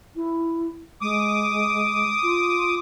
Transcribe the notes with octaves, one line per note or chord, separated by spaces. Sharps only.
E4
G#3 D6 D#6
F4